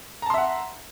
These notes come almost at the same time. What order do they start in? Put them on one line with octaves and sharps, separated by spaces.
A#5 A5 C6 E5 F#5